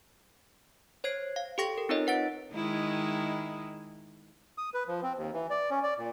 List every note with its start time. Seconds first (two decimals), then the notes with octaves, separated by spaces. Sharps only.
1.04 C5 C#5 G#6 C7
1.36 F5
1.58 G4 A4 G5 C#6 A#6
1.78 A#4
1.89 C4 D#4 F4 A#4 C#5 D#5
2.07 B4 F#5 A6 D7
2.52 D#3 G#3 E4
4.58 D#6
4.74 B4
4.88 F3
5.03 C4
5.16 D#2
5.33 E3
5.50 D5
5.71 C#4
5.83 D5
5.98 A#2